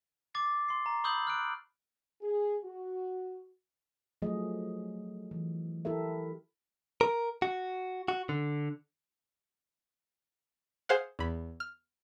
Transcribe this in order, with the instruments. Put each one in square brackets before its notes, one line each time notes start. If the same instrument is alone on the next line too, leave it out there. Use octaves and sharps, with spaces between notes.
[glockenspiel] D6 A6 C7
C6 C7
A#5
B5 C#6 D#6 E6 G6 F#7
F6 F#6 D7
[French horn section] G#4
F#4
[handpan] F3 F#3 A3 G#4 D#5
E3
E4 G4 A4 A#4 E5
[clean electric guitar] A#4
F#4
F#4
D3
[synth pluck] G#4 C5 F5 F#5
E2 B5
F6